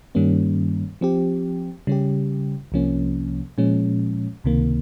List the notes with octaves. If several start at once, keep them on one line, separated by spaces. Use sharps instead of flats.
G2 D#3 G3 A#3 C#4
F3 C4 G4
C#3 G3 C#4 G4
C2 C3 F3 A#3 C#4
A#2 F3 G#3 C#4
C#2 C3 D#3 A#3